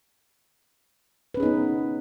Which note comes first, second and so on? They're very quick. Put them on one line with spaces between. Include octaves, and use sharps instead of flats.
B4 C#4 G#4 D#4 B3